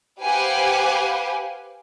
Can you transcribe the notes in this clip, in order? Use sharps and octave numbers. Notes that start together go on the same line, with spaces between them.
G4 B4 C5 F5 F#5 G#5